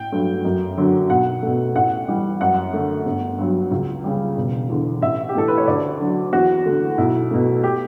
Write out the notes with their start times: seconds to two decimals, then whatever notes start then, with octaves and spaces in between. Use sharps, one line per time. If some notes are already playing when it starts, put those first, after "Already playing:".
Already playing: A1 G5
0.12 G2 F#3 A3
0.45 F#2
0.78 D3 F#3
1.10 B1 F#5
1.43 B2 A3
1.75 A1 F#5
2.08 A2 E3 G3
2.41 F#2 F#5
2.73 D3 A3
3.06 G1
3.38 G2 F#3
3.72 C#2
4.04 C#3 G3
4.37 E1
4.70 E2 D3
5.02 A1 E5
5.29 G4
5.35 A2 E3 A3 A4
5.48 B4
5.58 C#5
5.68 D2 D5
6.00 D3 F#3
6.33 E2 F#4
6.66 D3 A3
6.98 B1 E4
7.31 B2 A3
7.63 G4